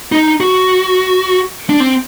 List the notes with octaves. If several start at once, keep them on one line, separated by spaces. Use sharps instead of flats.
D#4
F#4
D4
C4